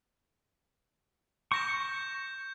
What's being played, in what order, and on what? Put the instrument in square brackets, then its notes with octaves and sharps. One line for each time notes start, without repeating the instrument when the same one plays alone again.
[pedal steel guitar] C#6 [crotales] G6 A#6 E7